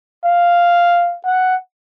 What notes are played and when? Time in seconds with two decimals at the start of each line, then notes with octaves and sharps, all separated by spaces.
0.24 F5
1.26 F#5